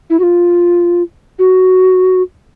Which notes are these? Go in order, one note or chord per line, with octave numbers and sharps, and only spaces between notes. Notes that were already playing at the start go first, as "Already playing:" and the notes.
E4
F#4
F4
F#4